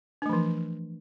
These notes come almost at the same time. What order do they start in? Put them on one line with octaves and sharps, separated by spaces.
D4 A3 F3 E3